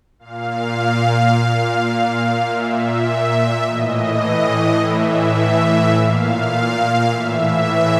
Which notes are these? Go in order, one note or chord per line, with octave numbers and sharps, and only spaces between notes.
A#2 F5
A#2
A#2 E5
A2 E3 D#5
A2 E3 E5
A#2 F5
A2 E3 E5